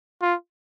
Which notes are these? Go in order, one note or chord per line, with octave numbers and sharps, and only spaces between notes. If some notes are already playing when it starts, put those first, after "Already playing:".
F4